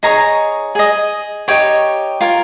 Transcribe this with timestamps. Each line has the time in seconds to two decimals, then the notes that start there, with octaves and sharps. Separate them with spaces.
0.03 D#4 G#4 C#5 A#5
0.75 G#4 D#5
1.48 D#4 G4 C#5 G5
2.21 F4 A#4 C#5